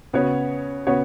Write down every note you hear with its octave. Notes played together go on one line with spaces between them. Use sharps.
C#3 B3 F#4 C#5
C#3 B3 F#4 C#5